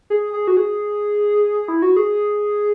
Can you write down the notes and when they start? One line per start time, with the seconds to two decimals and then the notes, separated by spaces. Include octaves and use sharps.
0.10 G#4
0.33 G#4
0.47 F#4
0.57 G#4
1.68 E4
1.82 F#4
1.96 G#4